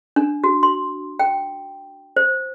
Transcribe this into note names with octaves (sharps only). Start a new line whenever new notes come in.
D4
F#4
C6
G5
C5